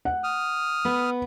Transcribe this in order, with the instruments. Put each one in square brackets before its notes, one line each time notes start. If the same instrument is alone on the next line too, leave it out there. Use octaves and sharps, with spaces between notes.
[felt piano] F#5
[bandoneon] D#6 F6
[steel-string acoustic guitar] B3 B4